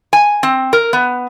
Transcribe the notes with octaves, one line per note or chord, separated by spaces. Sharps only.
G#5
C4
A#4
B3